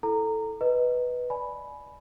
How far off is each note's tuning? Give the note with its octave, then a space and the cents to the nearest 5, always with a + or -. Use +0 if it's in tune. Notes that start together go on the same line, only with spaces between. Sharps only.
E4 +0 A4 +0 A#5 -15
B4 +0 D#5 +0
D5 +0 G#5 +30 B5 +0